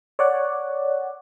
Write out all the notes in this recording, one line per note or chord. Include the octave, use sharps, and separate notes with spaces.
C#5 D5 F#5